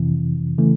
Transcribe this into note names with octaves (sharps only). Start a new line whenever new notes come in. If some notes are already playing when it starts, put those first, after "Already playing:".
Already playing: F2 C3 E3
C#3 E3 A3